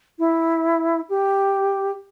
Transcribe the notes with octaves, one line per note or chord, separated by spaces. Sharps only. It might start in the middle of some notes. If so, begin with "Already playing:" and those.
E4
G4